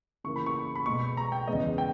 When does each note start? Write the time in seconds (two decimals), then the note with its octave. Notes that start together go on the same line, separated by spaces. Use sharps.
0.24 C#3 E3 A#3 C#6
0.36 B5
0.46 C#6
0.75 B5
0.86 B2 G#3 B3 C#6
1.17 A#5
1.32 G5
1.47 E2 C#3 G#3 B3 D#5
1.78 G5